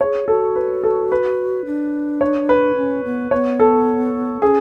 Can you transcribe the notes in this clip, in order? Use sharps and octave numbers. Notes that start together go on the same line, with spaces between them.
G#4 C#5
F#4 A4
B4
A4
B4
D4
C#5
B4
C#4
B3
B3 C#5
A4
C#4 G#4